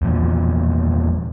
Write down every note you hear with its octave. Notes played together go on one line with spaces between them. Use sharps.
E2 A#2 F3